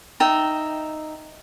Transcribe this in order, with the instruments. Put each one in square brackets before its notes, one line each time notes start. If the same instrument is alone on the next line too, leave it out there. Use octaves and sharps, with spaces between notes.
[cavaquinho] D#4 E5 G5